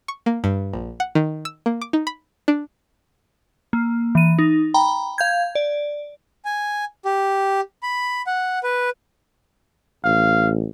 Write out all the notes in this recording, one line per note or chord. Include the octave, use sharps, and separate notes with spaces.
C#6
A#3
G2
A#1
F#5
D#3
E6
A#3
D6
D#4
B5
D4
A#3
E3 D#7
D#4
G5 A#5 B5
F5 G6 G#6
D5
G#5
G4
B5
F#5
B4
A1 F5